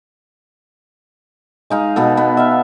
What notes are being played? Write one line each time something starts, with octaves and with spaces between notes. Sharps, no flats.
G#3 D#4 F5
B2 B3 A4
B3
E5 F5